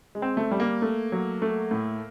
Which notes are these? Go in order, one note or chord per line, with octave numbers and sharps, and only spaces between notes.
G#3
C4
A3
G3
A#3
A3
F#3
A3
A2